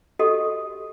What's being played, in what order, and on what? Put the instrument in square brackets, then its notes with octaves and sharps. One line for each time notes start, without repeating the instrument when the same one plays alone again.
[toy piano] F#4 G4 A4 D#5 D#6